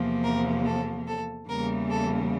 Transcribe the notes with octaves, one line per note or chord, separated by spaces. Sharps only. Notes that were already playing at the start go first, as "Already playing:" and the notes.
Already playing: E2 C3 F3 A#3
A#4
A4
A4
E2 C#3 E3 G3 A#3 A#4
A4